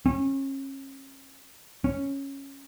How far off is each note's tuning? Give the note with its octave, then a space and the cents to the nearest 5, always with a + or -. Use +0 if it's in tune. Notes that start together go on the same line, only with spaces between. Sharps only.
C#4 -35
C#4 -10